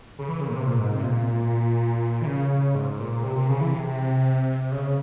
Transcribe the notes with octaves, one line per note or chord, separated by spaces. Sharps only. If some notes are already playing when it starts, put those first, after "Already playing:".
C#3
E3
C#3
A#2
C3
A#2
G#2
C3
A#2
E3
C#3
G#2
A#2
C3
C3
C#3
E3
C3
C#3